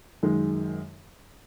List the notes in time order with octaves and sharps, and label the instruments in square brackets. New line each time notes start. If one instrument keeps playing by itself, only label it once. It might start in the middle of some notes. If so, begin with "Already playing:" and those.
[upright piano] F#2 D#3 G#3